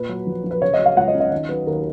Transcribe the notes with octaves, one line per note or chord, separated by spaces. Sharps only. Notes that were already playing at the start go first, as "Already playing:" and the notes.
Already playing: A#2 B4
F#3
A#1
A#1
B4
C#3 C#5
D#5
F#3
F5
C#2 F#5
D#5
C#4
D#5
D#3 D#5
F#3 B4
D#2 A#4